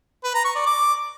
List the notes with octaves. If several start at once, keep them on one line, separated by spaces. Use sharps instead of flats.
B4
A#5
C#6
D5
D6